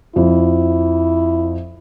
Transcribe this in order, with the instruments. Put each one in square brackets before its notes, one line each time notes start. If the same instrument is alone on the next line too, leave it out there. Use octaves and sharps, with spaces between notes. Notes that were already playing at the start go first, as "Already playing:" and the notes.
[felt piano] F2 [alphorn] E4